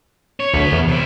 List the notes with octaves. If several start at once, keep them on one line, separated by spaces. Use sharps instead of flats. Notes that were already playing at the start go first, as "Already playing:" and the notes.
C#5
D2 B4 C#5
E2
C3 E4